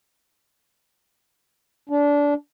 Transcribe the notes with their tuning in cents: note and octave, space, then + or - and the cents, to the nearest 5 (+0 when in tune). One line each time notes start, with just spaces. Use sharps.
D4 -20